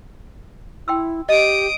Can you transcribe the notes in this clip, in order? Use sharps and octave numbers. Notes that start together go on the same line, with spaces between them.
E4 G5 C6 E6
G4 D#5 D#6 D7